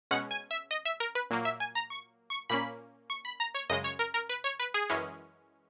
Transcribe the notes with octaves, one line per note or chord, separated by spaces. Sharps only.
B2 G#3 C#4 F#5
G#5
E5
D#5
E5
A#4
B4
A#2 F#3 A#3
E5
G#5
A#5
C#6
C#6
A#2 A#3 C#4 B5
C#6
B5
A#5
C#5
F#2 C#3 G#3 D#5
C#5
A#4
A#4
B4
C#5
B4
G#4
F#2 E3 G#3 C#4